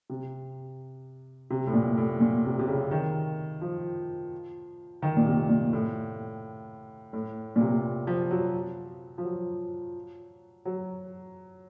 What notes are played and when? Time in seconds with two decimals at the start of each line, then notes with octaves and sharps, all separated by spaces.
0.10 C3
1.50 C3
1.67 A2
1.74 A#2
1.97 A2
2.20 A#2
2.44 C3
2.59 C3
2.67 C#3
2.91 D#3
3.61 F3
5.02 D#3
5.17 A#2
5.25 C3
5.49 A#2
5.73 A2
7.13 A2
7.56 A#2
7.61 C3
8.07 F3
8.31 F#3
9.18 F3
9.25 F#3
10.65 F#3